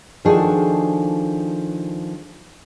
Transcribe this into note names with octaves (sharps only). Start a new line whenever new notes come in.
D#3 F3 D4 F#4 G#4 A4